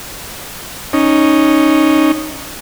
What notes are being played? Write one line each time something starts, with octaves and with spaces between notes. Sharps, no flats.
C#4 D#4